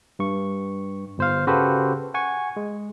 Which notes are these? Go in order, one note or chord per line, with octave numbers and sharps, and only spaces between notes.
G2 C#6
G1 C5 F5
C#3 F#4 G4 A4 B4 C5
F#5 G#5 C#6
G#3